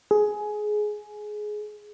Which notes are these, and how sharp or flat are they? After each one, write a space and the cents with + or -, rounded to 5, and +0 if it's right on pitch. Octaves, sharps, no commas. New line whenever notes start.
G#4 +15